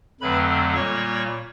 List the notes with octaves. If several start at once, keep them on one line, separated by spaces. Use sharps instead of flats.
F2 D3 F#3 A3 C4 B4 B5
A#2 G3 A#3 C#5 C#6